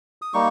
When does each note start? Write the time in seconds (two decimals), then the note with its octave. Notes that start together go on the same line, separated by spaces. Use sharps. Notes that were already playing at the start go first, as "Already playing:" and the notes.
0.22 D#6
0.34 G3 A#3 D#4 C#6